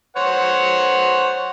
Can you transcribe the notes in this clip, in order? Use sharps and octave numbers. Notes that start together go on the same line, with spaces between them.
C5 C#5 F#5